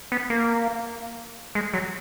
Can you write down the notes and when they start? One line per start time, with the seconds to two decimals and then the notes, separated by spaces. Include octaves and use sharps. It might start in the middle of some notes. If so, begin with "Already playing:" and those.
0.12 B3
0.30 A#3
1.55 G#3
1.74 F#3